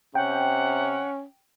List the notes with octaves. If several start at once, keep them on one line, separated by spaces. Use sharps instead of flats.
C3 C#4 F#5 G5